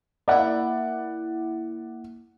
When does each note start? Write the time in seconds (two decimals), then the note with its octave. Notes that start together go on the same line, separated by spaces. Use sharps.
0.28 A#3 E4 D5 F#5